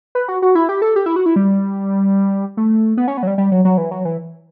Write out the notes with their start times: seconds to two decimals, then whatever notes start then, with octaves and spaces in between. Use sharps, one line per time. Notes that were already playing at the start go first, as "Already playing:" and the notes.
0.15 B4
0.28 F#4
0.42 F#4
0.55 E4
0.69 G4
0.82 A4
0.96 G4
1.06 E4
1.16 F#4
1.26 E4
1.36 G3
2.57 A3
2.97 B3
3.08 C#4
3.17 B3
3.23 F#3
3.27 G3
3.38 G3
3.52 F#3
3.65 F#3
3.78 E3
3.91 F#3
4.05 E3